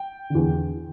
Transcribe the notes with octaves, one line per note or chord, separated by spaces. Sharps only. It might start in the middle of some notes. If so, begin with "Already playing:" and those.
Already playing: G5
E2 D3